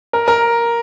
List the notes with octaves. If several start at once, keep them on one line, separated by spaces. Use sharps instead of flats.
A#4
A#4